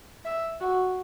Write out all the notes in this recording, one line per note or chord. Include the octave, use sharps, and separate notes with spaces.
E5
F#4